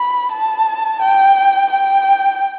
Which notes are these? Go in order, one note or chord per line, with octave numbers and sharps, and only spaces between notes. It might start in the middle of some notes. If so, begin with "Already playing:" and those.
Already playing: B5
A5
G5
G5